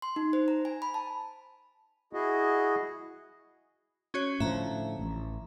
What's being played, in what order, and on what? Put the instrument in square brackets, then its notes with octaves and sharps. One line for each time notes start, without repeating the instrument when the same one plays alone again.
[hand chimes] C6
D#4
C5
A#5
G#5
B5
A5
[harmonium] E4 F#4 G#4 D#5
[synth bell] C#4 F#4 C#5
[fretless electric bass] A2 D3 F3 [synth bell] E5 A#5
[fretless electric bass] A1